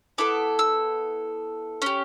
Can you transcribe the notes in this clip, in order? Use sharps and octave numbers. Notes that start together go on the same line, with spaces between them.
B3 E4 A4 D6
E6
C#4 G4